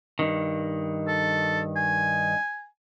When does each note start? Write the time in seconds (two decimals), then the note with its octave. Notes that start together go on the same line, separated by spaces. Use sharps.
0.19 G2 D#3
1.08 A4
1.76 G#5